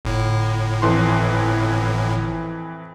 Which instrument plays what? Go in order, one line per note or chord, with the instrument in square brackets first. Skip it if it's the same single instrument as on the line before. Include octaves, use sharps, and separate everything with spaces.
[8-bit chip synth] G1 A2
[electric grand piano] F2 E3 C6